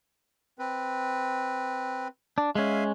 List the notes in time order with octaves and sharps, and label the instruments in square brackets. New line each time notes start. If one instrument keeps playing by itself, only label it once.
[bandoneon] C4 B4
[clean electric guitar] D4
[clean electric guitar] G#3 C#4 [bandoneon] E5 F5 G#5